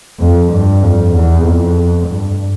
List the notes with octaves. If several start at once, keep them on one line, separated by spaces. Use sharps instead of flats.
F2
G2
F2
E2
F2
G2